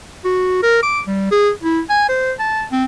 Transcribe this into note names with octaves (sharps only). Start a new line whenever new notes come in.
F#4
A#4
D6
G3
G#4
E4
G#5
C5
A5
C4